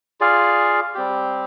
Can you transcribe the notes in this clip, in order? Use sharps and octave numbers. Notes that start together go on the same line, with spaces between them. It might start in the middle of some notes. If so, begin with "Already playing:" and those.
F4 G#4 D5 F5
G3 C4 G4